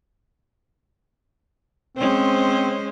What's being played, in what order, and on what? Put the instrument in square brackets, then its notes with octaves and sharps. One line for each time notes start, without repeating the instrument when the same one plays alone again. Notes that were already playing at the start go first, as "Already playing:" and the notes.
[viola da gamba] G#3 C#4 C5 [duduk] C4